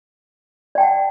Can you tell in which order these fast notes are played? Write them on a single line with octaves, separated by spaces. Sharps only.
D5 G5 A5 F#5